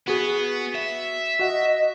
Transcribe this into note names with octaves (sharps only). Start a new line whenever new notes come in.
B3 F#4 G#4
E5
F#4 D#5 F#5